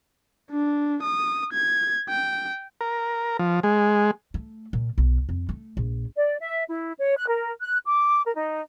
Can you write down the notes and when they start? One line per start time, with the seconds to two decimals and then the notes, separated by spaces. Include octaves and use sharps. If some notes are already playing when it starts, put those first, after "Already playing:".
0.51 D4
1.03 D#6
1.53 G#6
2.09 G5
2.81 A#4
3.39 F3
3.63 G#3
4.34 A3
4.73 A#2
4.98 B1
5.29 F2
5.49 A3
5.77 A#1
6.16 D5
6.39 E5
6.68 E4
6.99 C#5
7.16 F#6
7.28 A#4
7.62 F#6
7.86 D6
8.24 A#4
8.36 D#4